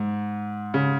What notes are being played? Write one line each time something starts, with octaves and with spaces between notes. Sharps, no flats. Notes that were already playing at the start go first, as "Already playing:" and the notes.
Already playing: G#2
C#3